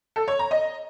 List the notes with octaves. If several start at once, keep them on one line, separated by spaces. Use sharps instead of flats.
A4
C#5
A#5
D#5